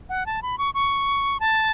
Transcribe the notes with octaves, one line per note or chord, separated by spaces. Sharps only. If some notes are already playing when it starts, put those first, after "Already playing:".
F#5
A5
B5
C#6
C#6
A5